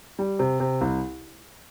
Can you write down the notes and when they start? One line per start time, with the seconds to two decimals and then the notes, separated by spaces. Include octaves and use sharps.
0.19 G3
0.39 C3
0.60 C3
0.81 C2